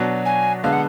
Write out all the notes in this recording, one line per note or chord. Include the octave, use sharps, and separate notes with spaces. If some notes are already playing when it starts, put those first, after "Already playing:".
Already playing: B2 F#3 D4 F#4
G#5
D3 G#3 B3 F5
F#5